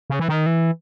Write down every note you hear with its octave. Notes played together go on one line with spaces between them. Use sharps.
C#3
E3
D#3
E3